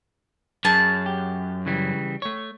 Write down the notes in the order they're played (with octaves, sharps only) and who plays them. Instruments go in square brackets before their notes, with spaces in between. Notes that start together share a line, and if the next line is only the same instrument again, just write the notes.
[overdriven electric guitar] F#2 [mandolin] G#4 A5
[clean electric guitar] G4
C#3 E3 G3
A3 C#5